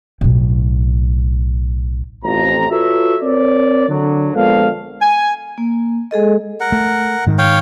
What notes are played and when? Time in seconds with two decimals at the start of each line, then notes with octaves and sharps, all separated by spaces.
0.21 B1 A2
2.24 A1 F2 A#5
2.71 F4 F#4 A4 B4 C#5 E5
3.23 C4 A#4 C#5 D5
3.89 D3 F#3
4.34 A#1 G#3 B3 A4 F5
5.01 G#5
5.58 A#3
6.11 G#3 G#4 A4 D#5
6.60 A#4 F#5
6.72 A3
7.27 G#2 D#3
7.38 C#5 F5 G5